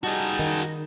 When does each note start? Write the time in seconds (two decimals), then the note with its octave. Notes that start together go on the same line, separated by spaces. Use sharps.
0.03 G3 D#4 F#4 G#4 A5
0.39 D#3